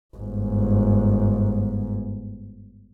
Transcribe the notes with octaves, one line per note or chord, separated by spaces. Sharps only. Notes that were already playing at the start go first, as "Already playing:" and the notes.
G1 G#2